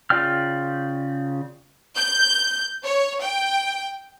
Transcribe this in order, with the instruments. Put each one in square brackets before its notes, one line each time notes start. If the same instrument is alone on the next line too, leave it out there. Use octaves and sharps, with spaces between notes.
[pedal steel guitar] C#3 F4 D5 G5 F6
[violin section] G6
C#5
G5